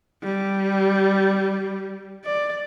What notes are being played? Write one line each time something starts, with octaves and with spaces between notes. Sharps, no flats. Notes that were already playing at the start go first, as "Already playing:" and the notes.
G3
D5